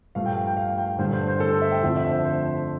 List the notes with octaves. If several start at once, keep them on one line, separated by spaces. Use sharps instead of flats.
G2 F3 A3 F5
G5
G5
G5
F5
G5
G2 D3 A3 C5
C5
C5
A4
C5
E5
G5
F2 D3 F3 A3
E5
C5
C5